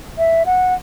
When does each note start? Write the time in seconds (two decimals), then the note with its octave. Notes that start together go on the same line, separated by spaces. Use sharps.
0.18 E5
0.46 F#5